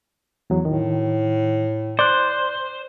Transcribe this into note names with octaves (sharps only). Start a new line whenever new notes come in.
E2 F#3
A2 D#3
C5 D5 F#6